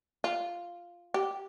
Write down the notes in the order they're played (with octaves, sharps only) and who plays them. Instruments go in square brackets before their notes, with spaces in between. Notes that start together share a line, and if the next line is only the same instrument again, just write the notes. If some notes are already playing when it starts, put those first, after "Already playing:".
[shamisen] F4
G4